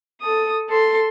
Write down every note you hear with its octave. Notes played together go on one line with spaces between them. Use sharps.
A4 D#6
A4 C6